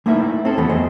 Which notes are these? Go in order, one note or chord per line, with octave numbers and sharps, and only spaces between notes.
A3 A#3 D#4 E4 B4 E5
C4 A4
D#2 E3 A3 B3
F2 G#4 C5 D#5